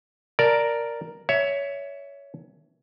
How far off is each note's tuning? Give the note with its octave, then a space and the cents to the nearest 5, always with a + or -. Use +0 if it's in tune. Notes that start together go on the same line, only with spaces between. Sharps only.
A#4 +0 D5 +0 A5 +0
C#5 +20 E5 +0